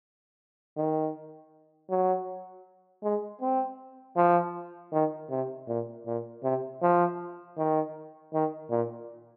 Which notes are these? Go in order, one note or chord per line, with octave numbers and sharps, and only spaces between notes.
D#3
F#3
G#3
C4
F3
D#3
C3
A#2
A#2
C3
F3
D#3
D#3
A#2